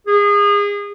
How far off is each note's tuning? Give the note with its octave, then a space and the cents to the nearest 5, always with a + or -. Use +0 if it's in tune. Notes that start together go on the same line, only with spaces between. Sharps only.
G#4 -30